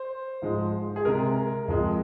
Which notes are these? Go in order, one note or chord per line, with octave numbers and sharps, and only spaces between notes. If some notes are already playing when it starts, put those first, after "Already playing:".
Already playing: C5
G#2 F3 G#3
G#4
C3 G#3 A#4
F2 F3 G#3